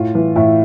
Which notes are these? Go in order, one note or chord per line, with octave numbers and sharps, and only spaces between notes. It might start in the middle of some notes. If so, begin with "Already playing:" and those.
Already playing: A2 F4
E3
A2 E4